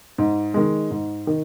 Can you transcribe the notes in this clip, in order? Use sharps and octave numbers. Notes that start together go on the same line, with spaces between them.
G#2
D#3 G#3
G#2
D#3